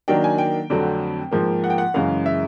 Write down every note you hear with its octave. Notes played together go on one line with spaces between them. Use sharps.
D#3 F#3 A#3 D4 G5
G#5
G5
F2 D3 F#3 A3 C4
G#2 F3 A#3
F#5
G5
F#5
F#2 C#3 E3 G#3 F5
E5